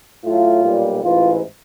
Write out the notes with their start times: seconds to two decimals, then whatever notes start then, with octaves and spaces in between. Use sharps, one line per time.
0.25 A2 F#3 A3 F4
0.63 B1 A#2 G3
1.02 A1 G#2 E3 F4